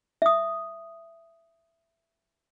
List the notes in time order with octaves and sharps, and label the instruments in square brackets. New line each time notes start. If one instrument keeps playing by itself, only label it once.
[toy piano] E5 D#6